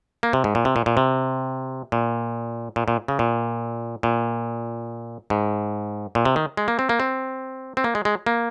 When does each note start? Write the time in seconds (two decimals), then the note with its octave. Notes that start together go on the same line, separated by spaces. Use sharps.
0.23 A#3
0.33 C3
0.44 G#2
0.55 A#2
0.65 C3
0.76 A#2
0.86 A#2
0.97 C3
1.92 A#2
2.76 A#2
2.88 A#2
3.08 C#3
3.19 A#2
4.03 A#2
5.30 G#2
6.15 A#2
6.25 C3
6.36 D#3
6.57 G#3
6.68 A#3
6.79 C4
6.89 A#3
7.00 C4
7.77 C4
7.84 A#3
7.95 G#3
8.05 G#3
8.27 A#3